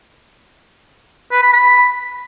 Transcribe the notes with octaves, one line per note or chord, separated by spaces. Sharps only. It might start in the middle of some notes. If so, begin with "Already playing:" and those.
B4
B5
B5